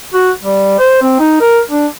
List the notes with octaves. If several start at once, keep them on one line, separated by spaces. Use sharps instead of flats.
F#4
G3
C5
C4
D#4
A#4
D4